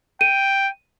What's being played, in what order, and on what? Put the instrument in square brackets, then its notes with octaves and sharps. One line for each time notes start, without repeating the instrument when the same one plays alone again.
[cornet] G5 [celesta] D#7